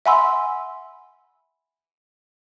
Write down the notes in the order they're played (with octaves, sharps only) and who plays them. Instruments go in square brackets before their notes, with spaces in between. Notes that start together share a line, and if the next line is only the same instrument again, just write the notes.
[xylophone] E5 F#5 G#5 B5 C6 E6